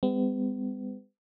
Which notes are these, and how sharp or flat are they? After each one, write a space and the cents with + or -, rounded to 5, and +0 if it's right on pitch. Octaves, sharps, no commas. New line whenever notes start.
G#3 -45 B3 +45